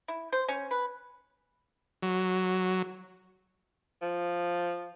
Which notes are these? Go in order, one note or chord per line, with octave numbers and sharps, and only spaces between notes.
E4
C5
C#4
B4
F#3
F3